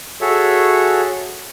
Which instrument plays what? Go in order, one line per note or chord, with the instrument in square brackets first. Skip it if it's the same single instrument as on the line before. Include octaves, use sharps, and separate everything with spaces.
[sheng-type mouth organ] F#4 G#4 A4 C#5 E5